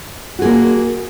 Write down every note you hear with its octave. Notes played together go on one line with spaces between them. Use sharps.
A#3 F#4 G#4